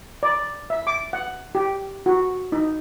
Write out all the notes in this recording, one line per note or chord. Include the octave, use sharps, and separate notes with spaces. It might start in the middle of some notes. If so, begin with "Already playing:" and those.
D5
E5
D6
F#5
G4
F#4
D#4